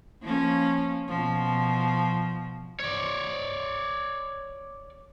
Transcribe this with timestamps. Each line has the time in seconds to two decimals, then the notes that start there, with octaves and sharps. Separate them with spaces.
0.22 F3 A#3 C#4
1.08 B2 F3
2.80 C#5 D5